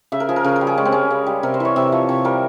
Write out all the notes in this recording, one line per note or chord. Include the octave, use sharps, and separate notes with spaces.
C#3 E5
A#4
F3 G#4
A#4
C#3 G#4
A#4
G3
G#4
G#3 C#4
C4
G#3 C#4
C#3
G3
C3 A#4
C5
E3 C#5
C3 E5
F3 C#5
C3 C#5
G3 A#4